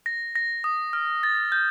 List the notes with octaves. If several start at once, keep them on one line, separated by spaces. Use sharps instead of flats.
A#6
A#6
D#6
F6
A6
G6